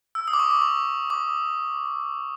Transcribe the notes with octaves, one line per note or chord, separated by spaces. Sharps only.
E6
D#6
D6
C#6
D6
C#6
D6